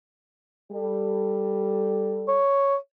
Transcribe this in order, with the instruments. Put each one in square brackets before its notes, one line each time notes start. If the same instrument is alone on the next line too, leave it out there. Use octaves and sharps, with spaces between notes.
[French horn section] G3 A4
[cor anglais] C#5